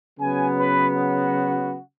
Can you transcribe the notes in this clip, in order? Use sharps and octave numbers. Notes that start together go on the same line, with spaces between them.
C#3 F#3 B3 G#5
B4
F#4